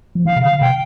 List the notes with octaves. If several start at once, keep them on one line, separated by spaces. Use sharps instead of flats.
F3
E3 F5
C3
D3 F5
C3 G5